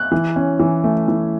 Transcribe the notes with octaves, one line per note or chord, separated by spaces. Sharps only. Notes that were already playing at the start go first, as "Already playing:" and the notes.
Already playing: F#6
E3
C#4
E3
A3
E3